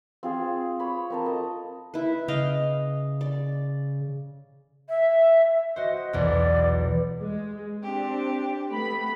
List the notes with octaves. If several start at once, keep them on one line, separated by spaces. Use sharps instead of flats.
C4 F4 G#4
C#5 B5
C4 A#4 A5
A4 D#5
E4 B4
C#3 D#5 F5 G5
D5
E5
F#4 C5 D#5
B1 E2 D5
G#3
C4 D4 G4
A3 B3 B5